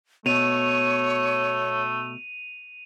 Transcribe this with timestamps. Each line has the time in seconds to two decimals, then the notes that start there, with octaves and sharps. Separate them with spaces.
0.26 B2 A3 C#5 D#7 F7